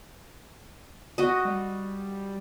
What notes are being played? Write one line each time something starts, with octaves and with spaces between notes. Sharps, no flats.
F#4 D#5
G3